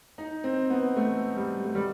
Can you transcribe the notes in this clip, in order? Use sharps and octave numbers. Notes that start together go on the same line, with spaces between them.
D#4
C4
B3
A3
G3
A3
G3